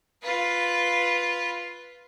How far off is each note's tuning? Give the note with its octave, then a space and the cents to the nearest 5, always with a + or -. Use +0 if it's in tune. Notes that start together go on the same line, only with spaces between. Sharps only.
F4 +0 B4 +0